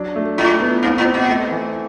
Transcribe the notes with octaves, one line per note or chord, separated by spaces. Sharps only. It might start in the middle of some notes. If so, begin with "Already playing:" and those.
Already playing: F#3 D4
A3
A2 E4
B3
G#2 C4
A2
C4
B2
A3
E3